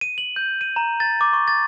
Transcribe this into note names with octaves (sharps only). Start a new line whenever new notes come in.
D#7
F#7
G6
D#7
A#5
A6
D6
C#6
A6